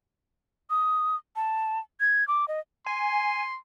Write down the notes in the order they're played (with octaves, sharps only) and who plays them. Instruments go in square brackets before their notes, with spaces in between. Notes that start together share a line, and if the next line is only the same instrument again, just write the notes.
[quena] D#6
A5
G#6
D6
D#5
[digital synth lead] G#5 [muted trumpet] C6